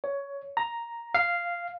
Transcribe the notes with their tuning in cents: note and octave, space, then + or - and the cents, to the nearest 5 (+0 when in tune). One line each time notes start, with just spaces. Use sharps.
C#5 +15
A#5 +5
F5 -5